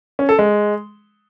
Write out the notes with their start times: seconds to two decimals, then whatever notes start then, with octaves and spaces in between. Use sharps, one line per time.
0.19 C#4
0.29 A4
0.39 G#3